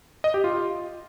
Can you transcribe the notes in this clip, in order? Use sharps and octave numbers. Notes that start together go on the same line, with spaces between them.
D#5
G4
F4